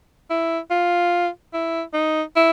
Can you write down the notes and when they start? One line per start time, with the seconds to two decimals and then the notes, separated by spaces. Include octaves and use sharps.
0.30 E4
0.70 F4
1.53 E4
1.93 D#4
2.36 E4